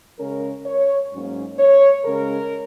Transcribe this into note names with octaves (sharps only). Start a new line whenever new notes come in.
C#3 G#3 C#4 A#4
C#5
G#2 F#3 A#3 C#4
C#5
C#3 G#3 C#4 A#4